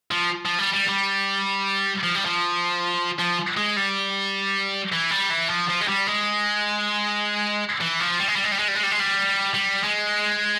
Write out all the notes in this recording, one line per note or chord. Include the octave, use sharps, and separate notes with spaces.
F3
F3
G3
G3
G3
F3
G3
F3
F3
G#3
G3
E3
G3
E3
F3
F3
G#3
G3
G#3
E3
F3
G3
G#3
G3
G#3
G3
G#3
G3
G#3
G3
G#3
G3
G3
G#3